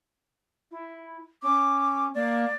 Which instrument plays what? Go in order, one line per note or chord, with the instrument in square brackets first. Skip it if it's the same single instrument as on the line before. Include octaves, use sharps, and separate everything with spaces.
[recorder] E4
[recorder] C#4 [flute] D6
[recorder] A#3 [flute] D5